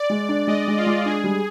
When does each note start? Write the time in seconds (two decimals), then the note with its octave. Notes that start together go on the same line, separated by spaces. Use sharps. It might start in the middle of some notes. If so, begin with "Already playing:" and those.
Already playing: D5
0.10 G#3
0.29 D4
0.47 G#3 D#5
0.68 G#3
0.77 F4
0.86 G#3
1.05 D4 G#4
1.24 G3